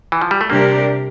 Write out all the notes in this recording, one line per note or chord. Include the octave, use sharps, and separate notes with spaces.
E3
F3
G3
A3
C3 G3 A#3 D4 G4 A#4